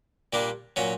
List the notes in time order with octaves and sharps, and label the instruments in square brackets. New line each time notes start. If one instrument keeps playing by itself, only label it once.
[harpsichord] A#2 G3 A#3 D4
A#2 F#3 C#4